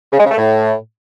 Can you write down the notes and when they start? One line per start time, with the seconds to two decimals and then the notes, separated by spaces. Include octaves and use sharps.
0.13 C#3
0.19 G#3
0.25 C#3
0.31 A3
0.37 A2